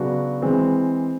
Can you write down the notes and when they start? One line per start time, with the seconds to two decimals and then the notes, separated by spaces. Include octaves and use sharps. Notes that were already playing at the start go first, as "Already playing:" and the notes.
Already playing: C#3 F#3 B3 D4 F#4
0.42 E3 G#3 C4